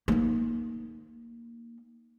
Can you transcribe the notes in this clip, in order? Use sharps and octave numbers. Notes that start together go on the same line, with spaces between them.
A#3 D#4